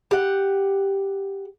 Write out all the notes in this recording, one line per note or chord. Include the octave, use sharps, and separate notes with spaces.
G4 F#5